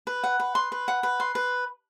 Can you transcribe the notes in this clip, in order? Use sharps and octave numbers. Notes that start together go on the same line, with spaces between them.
B4
F#5
B4
C6
B4
F#5
B4
C6
B4